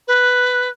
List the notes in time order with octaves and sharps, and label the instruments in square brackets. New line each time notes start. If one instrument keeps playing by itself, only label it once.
[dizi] B4